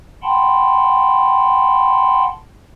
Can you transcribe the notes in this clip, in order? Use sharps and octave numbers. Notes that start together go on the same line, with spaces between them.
F#5 G5 A5 B5 C6